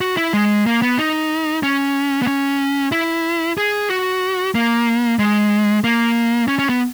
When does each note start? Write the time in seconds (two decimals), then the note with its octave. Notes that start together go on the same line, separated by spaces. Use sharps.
0.01 F#4
0.17 E4
0.33 G#3
0.66 A#3
0.82 B3
0.98 D#4
1.63 C#4
2.22 B3
2.27 C#4
2.92 E4
3.58 G#4
3.90 F#4
4.55 A#3
5.19 G#3
5.84 A#3
6.48 C#4
6.59 C#4
6.69 B3